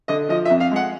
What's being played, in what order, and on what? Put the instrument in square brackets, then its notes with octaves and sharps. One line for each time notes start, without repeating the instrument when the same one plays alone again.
[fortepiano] D3 D#5
F3 D#5
E5
F2
F5
G#3 F#5